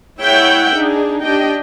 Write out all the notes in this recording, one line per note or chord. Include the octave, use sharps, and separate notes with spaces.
G#3 E4 C#5 E5 F#5 G5
D4 D#4 G#4
D4 G4 D#5 G5